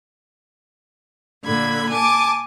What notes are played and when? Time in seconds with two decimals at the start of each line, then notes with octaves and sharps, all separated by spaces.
1.43 A#2 D3 B5 G#6
1.90 G#5 A5 D6